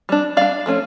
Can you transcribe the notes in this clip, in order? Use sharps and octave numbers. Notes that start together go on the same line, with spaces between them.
G3 D4
G3 D4 D5 F5
F3 A3 C#4